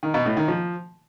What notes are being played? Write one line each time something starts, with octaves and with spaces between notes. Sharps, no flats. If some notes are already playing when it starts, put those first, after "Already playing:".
D#3
B2
A2
D#3
F3